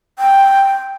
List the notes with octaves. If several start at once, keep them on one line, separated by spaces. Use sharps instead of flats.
G5